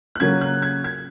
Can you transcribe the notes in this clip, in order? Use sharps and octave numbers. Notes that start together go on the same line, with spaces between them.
F#6
C#3 F#3 A#3 C#4 G#6
F#6
G#6
G#6